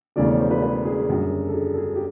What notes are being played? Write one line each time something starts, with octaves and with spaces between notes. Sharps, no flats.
E1 E2 C#3 F3 A3 D5
C#5
C5
B4
B4
G#4
F#1 F#2 D3 G3
A4
G#4
A4
G#4
G4